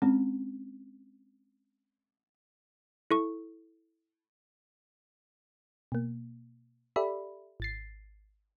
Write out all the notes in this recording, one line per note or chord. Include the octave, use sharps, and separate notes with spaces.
G#3 C4 C#4
E4 A4 C#6
B2 A#3
G4 A4 D5 E5 B5
G#1 A6 C7